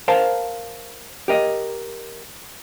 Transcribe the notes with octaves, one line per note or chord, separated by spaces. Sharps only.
A#4 C5 F5 A5
G4 A#4 D#5